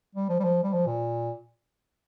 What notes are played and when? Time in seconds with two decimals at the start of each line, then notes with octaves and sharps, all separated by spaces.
0.15 G3
0.29 F3
0.39 G3
0.44 F3
0.63 G3
0.73 F3
0.86 A#2